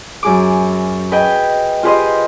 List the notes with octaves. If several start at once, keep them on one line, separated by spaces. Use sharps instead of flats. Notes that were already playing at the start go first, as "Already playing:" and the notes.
F#2 G#4 D6
G#4 B4 D#5 G5 G#5
F4 G4 G#4 B4 C5 D#5